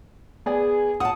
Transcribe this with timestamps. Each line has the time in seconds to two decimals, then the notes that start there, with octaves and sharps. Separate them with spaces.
0.46 B3 G#4 D5 G#5
1.00 F#5 A5 D#6